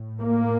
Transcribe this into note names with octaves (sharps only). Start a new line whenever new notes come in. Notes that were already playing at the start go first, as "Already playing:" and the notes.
Already playing: A2
A#3